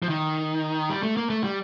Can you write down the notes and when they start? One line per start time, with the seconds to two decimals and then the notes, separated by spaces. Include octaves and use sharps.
0.02 F3
0.09 D#3
0.90 G3
1.03 A3
1.17 A#3
1.30 A3
1.44 G3